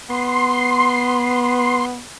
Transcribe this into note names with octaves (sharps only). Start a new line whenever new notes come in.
B3 C6